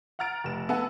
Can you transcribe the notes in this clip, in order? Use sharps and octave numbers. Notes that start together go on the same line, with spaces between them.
F#5 A#5 F6 A6 D7
F1 E7
B3 A4 E5 F#5 G#5